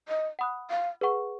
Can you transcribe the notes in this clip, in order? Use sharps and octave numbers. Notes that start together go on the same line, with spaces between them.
D#5
F#5 B5 D#6 F#6
F5
G#4 B4 F#5 C#6